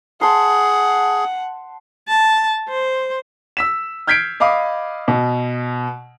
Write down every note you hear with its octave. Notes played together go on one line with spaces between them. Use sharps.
G#4 F#5 A5 C6
A5
C5
E6 B6 E7
F6 G6 G#6 B6 C7 D7
D#5 F5 B5 D6 D#6
B2